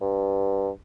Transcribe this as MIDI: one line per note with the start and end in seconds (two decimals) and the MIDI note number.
0.01 0.70 43